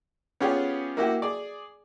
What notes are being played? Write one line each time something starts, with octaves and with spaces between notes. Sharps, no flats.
B3 C#4 F4 G4 G#4 C#5
A#3 E4 F#4 G4
G#4 D5